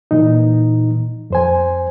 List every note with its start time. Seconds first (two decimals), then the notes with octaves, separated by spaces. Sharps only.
0.11 A#2 E3 D#4
1.30 F2 C5 G#5